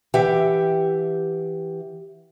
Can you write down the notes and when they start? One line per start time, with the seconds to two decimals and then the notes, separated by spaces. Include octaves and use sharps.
0.14 E3 G4 E5 F#5 G5